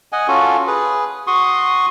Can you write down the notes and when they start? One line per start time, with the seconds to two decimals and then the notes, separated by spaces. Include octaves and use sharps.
0.12 D#5 F#5 G#5
0.28 C#4 F4 F#4 A4
0.67 G#4 B4
1.27 F#4 C6 C#6 D#6